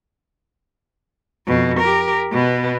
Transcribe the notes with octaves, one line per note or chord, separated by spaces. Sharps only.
F2 B2
G4 A#4
B2 B3